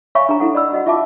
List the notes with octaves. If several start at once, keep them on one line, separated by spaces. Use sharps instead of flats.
C#5 E5 F5 G#5 B5 C#6
D4 G4 G#4 A#5
E4 A4 F#5
D5 D#5 B5 E6
F#4 D#5 F#5
F4 G4 E5 F5 A5 D6